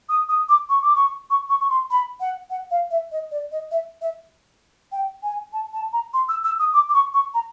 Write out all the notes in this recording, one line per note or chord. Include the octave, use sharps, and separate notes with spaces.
D#6
D#6
D6
C#6
D6
C#6
C#6
C#6
C#6
C6
B5
F#5
F#5
F5
E5
D#5
D5
D#5
E5
E5
G5
G#5
A5
A5
A#5
C6
E6
E6
D#6
D6
D6
C#6
C#6
A#5